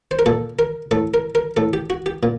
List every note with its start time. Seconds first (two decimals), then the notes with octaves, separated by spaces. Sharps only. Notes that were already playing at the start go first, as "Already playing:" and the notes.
0.11 C5
0.19 A#4
0.26 A#2 A4
0.59 A#4
0.91 A2 A4
1.14 A#4
1.35 A#4
1.57 A2 A4
1.73 G4
1.90 F#4
2.06 G4
2.23 A#2